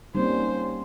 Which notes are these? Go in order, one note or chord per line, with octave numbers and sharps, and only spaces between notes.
G3 A#3 C4 C#4 D#4 C5